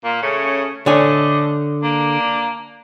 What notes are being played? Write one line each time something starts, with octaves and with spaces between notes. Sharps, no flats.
A#2 A#3
C#3 A3 C#4
D3 A3 D4 C#5 D#5 G#5
A#3 D4